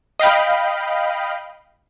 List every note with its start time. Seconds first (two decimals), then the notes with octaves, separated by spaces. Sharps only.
0.19 D#5 F5 G5 B5